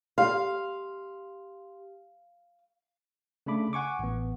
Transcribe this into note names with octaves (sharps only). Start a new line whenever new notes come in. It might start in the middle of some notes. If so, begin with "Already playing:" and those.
G4 F5 C6
C#3 A3 D4 B5 D6
F#5 G#5 C#6 D6
A1 B3